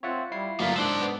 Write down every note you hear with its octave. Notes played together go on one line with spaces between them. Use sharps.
C4 F4 C#5 E5 F#5 A6
G3 E4 C7
G1 F#3 A#3 F4 B6
G#2 D4 C5 D5 E6 F#6
B3